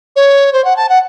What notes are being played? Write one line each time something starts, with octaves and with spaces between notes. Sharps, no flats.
C#5
C5
F#5
A5
F#5